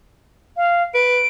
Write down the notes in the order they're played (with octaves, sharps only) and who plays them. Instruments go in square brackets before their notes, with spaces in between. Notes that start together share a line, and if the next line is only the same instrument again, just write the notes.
[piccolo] F5
[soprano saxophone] B4 [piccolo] D7